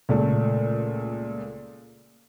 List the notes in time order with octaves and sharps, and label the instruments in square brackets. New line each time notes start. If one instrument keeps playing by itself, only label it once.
[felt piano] C#2 A#2 A3